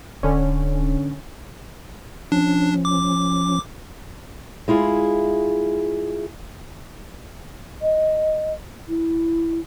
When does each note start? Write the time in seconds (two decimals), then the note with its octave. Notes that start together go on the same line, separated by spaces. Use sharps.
0.23 D1 D3 C#4
2.32 F3 C#4 D4
2.85 D6
4.68 G#3 E4 F4 G#4
7.82 D#5
8.89 E4